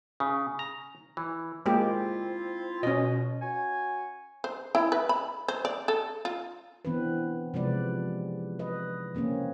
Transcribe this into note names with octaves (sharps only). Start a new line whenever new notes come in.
C#3
A#5
E3
G#3 A#3 C4 E4 F4 G4
B2 C#4 D#5
F#4 C#5 G#5
C5
E4
B4
B5
C5
D5
A4
F4
E3 B3 C4 D4 B4
C3 F3 G#3 B4 D5
B4 D#5
C#3 A#3 C4 C#4